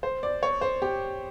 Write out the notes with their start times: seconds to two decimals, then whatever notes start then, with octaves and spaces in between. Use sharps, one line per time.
0.03 C5
0.23 D5
0.43 C#5
0.61 C5
0.82 G4